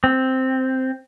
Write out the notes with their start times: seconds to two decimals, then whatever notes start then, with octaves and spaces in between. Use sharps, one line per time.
0.04 C4